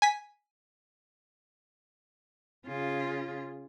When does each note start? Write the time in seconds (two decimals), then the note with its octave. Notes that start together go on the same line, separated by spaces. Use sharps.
0.02 G#5 B6
2.66 C#3 F4